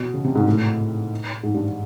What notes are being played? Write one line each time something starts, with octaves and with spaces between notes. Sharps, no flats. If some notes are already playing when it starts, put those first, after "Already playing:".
Already playing: B2
C#3
C3
G#2
A2
G#2
G2